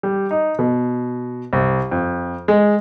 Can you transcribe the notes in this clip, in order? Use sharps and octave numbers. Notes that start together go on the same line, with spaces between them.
G3
D#4
B2
C2
F2
G#3